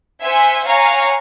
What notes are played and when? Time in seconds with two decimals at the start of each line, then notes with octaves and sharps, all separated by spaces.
0.22 C5 E5 F#5 G#5
0.66 C#5 F5 F#5 G#5 A#5 C#6